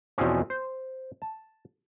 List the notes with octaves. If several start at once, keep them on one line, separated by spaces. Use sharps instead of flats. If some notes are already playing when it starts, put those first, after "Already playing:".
E2 B2 F3 C4 C#4
C5
A5